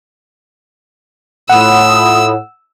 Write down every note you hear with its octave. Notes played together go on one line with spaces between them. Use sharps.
A2 F4 F#5 B5 D#6 E6